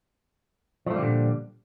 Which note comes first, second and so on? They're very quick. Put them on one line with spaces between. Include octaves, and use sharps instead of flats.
F3 A3 G3 D3 A#2